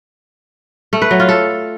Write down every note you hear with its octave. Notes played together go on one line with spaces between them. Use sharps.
A3
B4
F#3
F4
A4